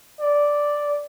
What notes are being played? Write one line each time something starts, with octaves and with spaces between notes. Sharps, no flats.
D5